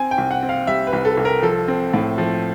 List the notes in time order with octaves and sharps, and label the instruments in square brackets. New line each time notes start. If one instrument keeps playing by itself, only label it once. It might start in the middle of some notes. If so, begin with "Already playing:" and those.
Already playing: [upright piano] C4 G#5
G5
C2
F#5
C4
F5
G3 E5
B4
C2
A4
C2
A#4
F3 A4
C4
A2
F3